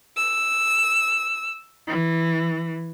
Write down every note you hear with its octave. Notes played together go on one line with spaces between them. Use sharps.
E6
E3